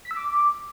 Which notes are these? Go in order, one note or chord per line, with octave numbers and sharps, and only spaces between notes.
B6
E6
D6